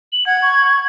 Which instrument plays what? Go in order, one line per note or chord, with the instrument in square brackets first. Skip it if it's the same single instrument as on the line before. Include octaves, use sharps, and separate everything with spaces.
[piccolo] F#7
[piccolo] F#5 [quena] G#6
[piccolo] C#6